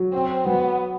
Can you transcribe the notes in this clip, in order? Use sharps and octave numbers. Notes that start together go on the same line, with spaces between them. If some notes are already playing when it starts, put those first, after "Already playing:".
Already playing: F#3
C4
F#3 B3